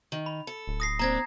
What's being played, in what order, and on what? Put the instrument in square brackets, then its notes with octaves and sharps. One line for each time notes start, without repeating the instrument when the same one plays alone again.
[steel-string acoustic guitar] D#3
[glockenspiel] B5
[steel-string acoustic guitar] A4
[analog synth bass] D1
[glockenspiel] D#6 A#6 C7
[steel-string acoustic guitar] A#3 C4 D4 [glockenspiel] A#5 G#6 A#6